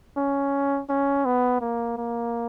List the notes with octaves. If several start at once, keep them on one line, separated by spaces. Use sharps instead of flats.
C#4
C#4
B3
A#3
A#3